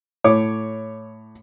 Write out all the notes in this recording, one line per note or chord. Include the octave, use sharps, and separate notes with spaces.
A2 C#5 D6